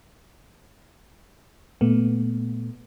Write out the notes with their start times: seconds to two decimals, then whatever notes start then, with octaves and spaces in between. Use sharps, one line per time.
1.81 A#2 A3 B3